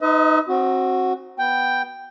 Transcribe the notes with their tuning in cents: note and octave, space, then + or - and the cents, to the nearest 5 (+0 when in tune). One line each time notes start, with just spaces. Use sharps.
D#4 +0 B4 +40 D#5 +45
C4 +30 F#4 +0
B3 +0 G5 +0